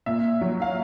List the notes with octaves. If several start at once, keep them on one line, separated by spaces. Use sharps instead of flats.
A#2 E5
F#3
F5